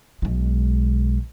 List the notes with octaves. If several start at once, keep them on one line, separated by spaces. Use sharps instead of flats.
B1 G#3